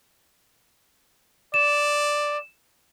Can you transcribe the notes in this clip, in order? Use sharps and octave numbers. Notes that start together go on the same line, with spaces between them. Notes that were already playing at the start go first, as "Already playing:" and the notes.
D5 E7